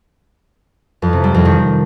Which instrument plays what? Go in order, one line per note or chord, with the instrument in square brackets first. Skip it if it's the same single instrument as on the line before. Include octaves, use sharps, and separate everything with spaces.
[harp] F2
C3
G3
F2
D#3